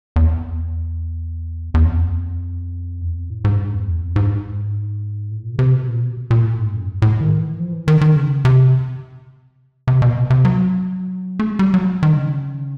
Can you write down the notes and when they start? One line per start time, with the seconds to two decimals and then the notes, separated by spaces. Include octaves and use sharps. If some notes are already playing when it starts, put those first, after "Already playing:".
0.16 E2
1.74 E2
1.87 F2
3.02 E2
3.16 F2
3.30 A2
3.44 G#2
3.58 G2
3.73 F2
3.87 E2
4.01 F2
4.16 G#2
5.31 A2
5.45 A#2
5.55 C#3
5.59 C3
5.73 B2
5.88 A#2
6.02 B2
6.31 A#2
6.45 A2
6.59 G#2
6.74 F#2
7.02 A2
7.21 D#3
7.39 E3
7.60 F3
7.73 E3
7.88 D#3
8.01 D#3
8.16 C#3
8.45 C3
9.87 C3
10.02 B2
10.16 C3
10.30 C3
10.45 F#3
11.39 A3
11.50 G#3
11.59 G3
11.74 F#3
12.03 D#3
12.16 C#3